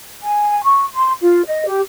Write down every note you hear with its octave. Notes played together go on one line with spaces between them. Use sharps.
G#5
C#6
C6
F4
D#5
G4